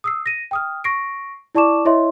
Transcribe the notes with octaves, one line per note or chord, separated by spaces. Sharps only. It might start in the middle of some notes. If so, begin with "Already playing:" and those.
D#6 E6 C7
A#6 D#7
G5 D#6 F6
C#6 A#6 C7 D7
E4 D5 A5 C#6 D6 E7
E4 C#5 D#5 E5 C6